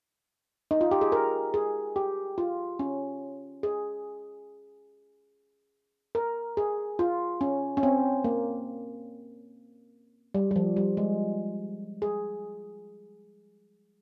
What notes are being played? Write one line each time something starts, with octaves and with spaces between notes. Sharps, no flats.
D#4
F4
G4
G#4
A#4
G#4
G4
F4
C#4
G#4
A#4
G#4
F4
C#4
C#4
C4
A#3
G3
G3
F3
G3
G#3
G#4